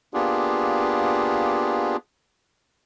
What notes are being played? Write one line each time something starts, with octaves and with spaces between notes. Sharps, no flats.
A#3 B3 D4 F4 G4 G#4